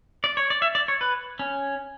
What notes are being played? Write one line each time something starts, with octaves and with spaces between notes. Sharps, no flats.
D5
C#5
D5
E5
D5
C#5
B4
C#4